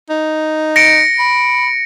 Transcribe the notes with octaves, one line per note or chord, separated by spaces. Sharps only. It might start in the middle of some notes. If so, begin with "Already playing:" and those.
D#4
A#6 C#7 D7
B5